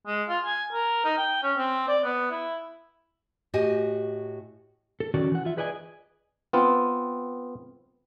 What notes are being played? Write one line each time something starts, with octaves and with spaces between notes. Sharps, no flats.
G#3
F4
G#5
A#4
D#4
G5
C#4
C4
D5
B3
E4
A2 F#4 G4 D#5 G#5
A4
D#3 F#3 C#4 F#4 A#4 D5
E3 F#5
F4 E5
G#4 B4 D5 D#5 F#5 G#5
B3 C4 F4